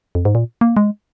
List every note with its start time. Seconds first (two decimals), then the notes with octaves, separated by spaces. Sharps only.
0.15 F2
0.25 G#2
0.35 A#2
0.61 A#3
0.77 G#3